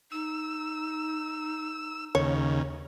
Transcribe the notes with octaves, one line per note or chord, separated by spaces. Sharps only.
D#4 E6
D#2 C#3 C#5